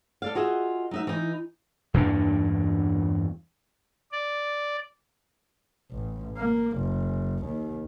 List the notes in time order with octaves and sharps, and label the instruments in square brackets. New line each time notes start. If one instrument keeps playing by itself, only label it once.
[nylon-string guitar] A4 D5 F5
F4 F#4 G#4 D#5 E5
F#3 D#4 E5
E3 D#4
[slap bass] E2 G2 A#2 D4
[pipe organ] D5
[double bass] A1
A#3
F#1
D#2